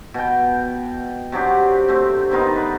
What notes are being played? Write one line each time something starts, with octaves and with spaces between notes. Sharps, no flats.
B2 G5
C3 F#3 D4 G4
A3 C4
D#3 B3 D#4 F4
B4